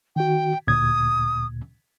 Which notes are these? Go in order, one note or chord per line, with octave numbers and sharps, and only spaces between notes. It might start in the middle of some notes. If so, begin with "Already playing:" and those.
D#3 F#4 G5
D2 A#2 D#6 G#6